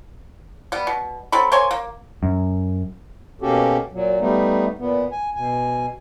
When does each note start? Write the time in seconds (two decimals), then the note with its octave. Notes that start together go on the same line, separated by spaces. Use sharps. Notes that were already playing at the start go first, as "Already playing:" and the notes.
0.72 G3 B3
0.87 B2
1.32 F#3 C4 A4 B5
1.52 A#3 C5 C#5 G#5
1.71 A#3
2.23 F#2
3.42 B2 A#3 C#4 F#4 G4 A4
3.93 A#2 F#3
4.20 G3 A3 B3 D#4
4.79 A#2 B3
5.11 G#5
5.35 B2 G#5